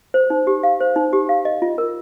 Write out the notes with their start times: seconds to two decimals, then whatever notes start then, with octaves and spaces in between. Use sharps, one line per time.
0.14 C5
0.30 D#4
0.47 G4
0.63 F5
0.80 C5
0.96 D#4
1.13 G4
1.29 F5
1.45 D#5
1.62 F4
1.78 A#4